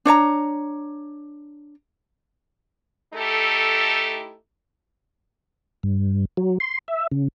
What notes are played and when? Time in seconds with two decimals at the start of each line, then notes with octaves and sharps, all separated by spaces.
0.05 D4 C#5 D5 A#5
3.14 A3 D#4 E4 G4 A4
5.83 G2
6.37 F#3
6.60 C6
6.88 E5
7.11 C#3